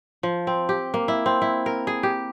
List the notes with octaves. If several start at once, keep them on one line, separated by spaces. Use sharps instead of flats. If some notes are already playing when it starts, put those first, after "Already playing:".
F3
C4
G4
A#3
E4
C4
E4
A#4
G#4
G4